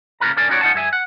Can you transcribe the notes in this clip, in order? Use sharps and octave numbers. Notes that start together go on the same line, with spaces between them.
C#2 C#3 A#3 F4 B4 A#5
C#2 D4 A#4 D5 G#5
C#4 D#4 F4 F#4 C#5 D5
D#4 F4 F#5 G#5 A5
G2 G#4 E5 G#5
F#5